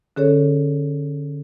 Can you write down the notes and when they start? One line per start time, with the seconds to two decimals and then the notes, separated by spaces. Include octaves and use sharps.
0.16 D3 C#4 G#4 A4 C#5